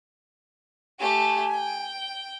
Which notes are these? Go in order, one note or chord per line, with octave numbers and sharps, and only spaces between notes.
A3 G4 G#5
G5